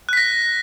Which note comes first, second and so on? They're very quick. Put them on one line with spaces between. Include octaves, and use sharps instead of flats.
F#6 B6 A#6